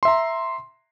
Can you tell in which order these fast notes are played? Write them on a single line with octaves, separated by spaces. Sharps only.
C6 E5 A#5